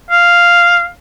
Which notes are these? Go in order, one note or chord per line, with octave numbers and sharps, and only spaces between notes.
F5